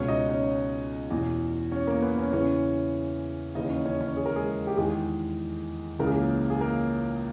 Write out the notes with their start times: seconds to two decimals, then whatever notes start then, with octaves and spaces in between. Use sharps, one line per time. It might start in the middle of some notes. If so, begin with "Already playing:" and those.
Already playing: C#2 B2 C#4 C#5
0.08 D#4 D#5
0.29 C#4 C#5
1.10 E2 B2
1.72 C#4 C#5
1.87 A#3 A#4
2.02 B3 B4
2.17 C#4 C#5
2.33 E2 C#3 E3 C#4 C#5
3.55 D#2 C#3 E3 D#4 D#5
3.70 C#4 C#5
3.85 C#4 C#5
4.01 C#4 C#5
4.17 G#4
4.26 A#4
4.36 G#3 G#4
4.67 G4
4.77 E2 D#3 G#3 G#4
5.99 C#2 C#3 E3 A#4
6.07 G#4
6.13 A#3 A#4
6.50 G#4
6.60 A#3 A#4